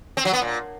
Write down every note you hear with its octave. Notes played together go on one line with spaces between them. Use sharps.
C4
F#3
B3
A#2